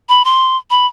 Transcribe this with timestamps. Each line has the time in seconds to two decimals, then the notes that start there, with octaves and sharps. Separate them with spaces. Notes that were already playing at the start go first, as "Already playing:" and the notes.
0.09 B5
0.25 C6
0.70 B5